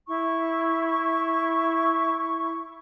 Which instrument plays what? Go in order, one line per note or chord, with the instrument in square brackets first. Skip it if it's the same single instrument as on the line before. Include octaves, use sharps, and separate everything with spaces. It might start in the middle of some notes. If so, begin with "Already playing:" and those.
[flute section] E4 C#6